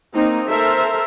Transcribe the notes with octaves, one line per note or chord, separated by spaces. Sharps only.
A#3 C4 D#4
A4 A#4 C5 E5